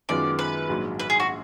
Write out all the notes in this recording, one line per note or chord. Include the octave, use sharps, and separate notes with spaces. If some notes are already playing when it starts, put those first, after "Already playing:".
F#2 D#3 G#3 B3 F4 D5
B4
A#1 G#2 F#3
B4
G#4
F#4